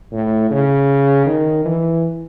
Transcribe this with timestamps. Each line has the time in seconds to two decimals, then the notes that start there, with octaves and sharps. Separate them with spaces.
0.12 A2
0.50 C#3
1.26 D#3
1.65 E3